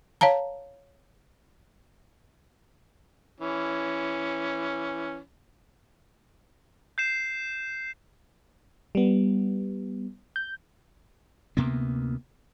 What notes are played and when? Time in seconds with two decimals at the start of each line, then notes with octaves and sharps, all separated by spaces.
0.21 C#5 F5 A5 A#5
3.41 E3 C#4
6.98 G6 C7 E7
8.95 G3 B3
10.36 G6
11.57 D2 C3 A#3 B3